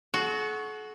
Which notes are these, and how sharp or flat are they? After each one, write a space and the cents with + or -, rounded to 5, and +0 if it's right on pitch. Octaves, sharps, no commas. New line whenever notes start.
F#4 +0 A4 -45